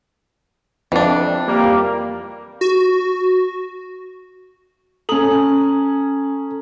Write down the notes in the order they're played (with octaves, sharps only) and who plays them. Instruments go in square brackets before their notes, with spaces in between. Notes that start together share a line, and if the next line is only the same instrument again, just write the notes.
[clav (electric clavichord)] F2 [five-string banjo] E3 D4
[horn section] G3 A#3
[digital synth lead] F#4
[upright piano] C#4 F#7 [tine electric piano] A4 A#5 D#6